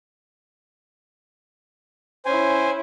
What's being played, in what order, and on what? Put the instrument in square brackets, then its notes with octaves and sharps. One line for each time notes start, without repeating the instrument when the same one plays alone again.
[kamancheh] C#4 E4 [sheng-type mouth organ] C5 G#5